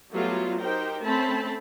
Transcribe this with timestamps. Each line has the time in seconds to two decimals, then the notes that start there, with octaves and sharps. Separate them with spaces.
0.12 F#3 G3 A3 B3 F4 F#4
0.60 D#4 G4 A#4 C5 G5
1.02 A3 C4 C#4 A5 B5